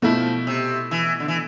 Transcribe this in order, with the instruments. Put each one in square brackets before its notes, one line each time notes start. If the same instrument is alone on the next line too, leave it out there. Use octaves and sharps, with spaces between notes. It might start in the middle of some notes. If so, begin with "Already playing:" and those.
[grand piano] B2 A3 E4 [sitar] F3
[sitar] C3
E3
D3
E3